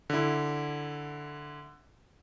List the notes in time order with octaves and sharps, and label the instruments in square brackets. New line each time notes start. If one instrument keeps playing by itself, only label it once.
[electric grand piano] D3 E4